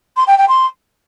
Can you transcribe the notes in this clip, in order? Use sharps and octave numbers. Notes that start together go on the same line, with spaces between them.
C6
G5
G5
C6